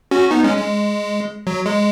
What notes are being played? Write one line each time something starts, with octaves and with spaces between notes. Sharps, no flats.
C#4 F#4
B3 D#4
G#3 C#4
G#3
F#3
G#3